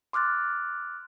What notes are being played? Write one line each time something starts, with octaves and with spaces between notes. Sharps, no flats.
C6 D6 F6 F#6 A6